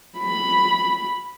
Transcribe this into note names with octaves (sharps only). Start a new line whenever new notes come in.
B5